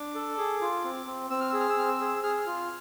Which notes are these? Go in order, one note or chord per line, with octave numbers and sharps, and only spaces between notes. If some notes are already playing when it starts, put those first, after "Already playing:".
Already playing: D4 D6
A4
G#4
F4
C4
C4
C4 E6
F6
G#4 E6
F6
E6
C4 F6
E6
G#4
G#4 F6
F6
F4